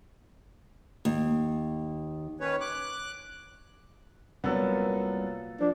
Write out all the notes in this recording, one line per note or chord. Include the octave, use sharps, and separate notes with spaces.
D#2
D#3 C#4 B4 C#5
D6 F#6
C2 A#2 F#3 B3 A4
F3 D4